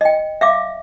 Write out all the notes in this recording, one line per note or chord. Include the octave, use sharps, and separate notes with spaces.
D#5 G5
E5 F5 D6